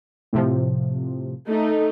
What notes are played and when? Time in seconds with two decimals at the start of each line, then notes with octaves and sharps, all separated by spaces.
0.33 A2 C3 F3
1.49 A3 D#4